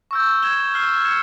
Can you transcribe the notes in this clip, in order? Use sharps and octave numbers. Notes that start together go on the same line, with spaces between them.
C#6 E6 G6
G#6 E7 G7
F6 C7 G7
G#6 C#7 E7